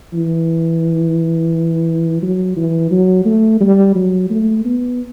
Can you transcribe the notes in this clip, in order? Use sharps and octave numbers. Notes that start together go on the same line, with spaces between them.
E3
F#3
E3
F#3
A3
G3
F#3
A3
B3